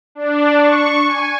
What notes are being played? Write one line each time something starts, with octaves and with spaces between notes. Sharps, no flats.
D4
C#6
G#5